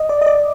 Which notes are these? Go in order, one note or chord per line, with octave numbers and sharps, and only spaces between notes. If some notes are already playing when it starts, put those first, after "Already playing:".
Already playing: D#5
D5
D#5
D5